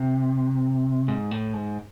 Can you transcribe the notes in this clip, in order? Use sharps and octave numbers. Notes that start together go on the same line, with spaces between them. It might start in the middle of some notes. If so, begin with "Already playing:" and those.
Already playing: C3
G#2
A2
G#2